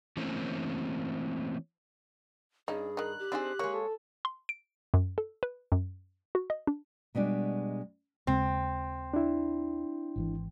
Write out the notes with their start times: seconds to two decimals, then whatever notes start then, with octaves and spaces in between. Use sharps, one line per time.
0.17 E3 A3 A#3 C4 C#4
2.68 G2 C#4 D#4 G#4
2.97 D#3 D#4 F#6
3.19 G4
3.32 C4 D4 D#4 F4 G#4 C5
3.59 G#3 A#3 C#5
3.74 A4
4.25 C6
4.49 D7
4.94 F#2
5.18 A4
5.43 B4
5.72 F#2
6.35 F#4
6.50 D#5
6.67 D4
7.15 B2 G3 G#3 D4
8.27 D#2 C#3 G#3 C4
9.14 D4 E4
10.16 G#1 C3 E3